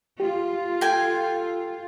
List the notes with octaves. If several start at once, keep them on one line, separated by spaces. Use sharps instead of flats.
F4 G4
A4 G5 G#5